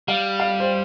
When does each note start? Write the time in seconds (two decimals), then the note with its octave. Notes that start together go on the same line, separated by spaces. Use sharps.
0.08 G3 F5
0.40 F5
0.60 C5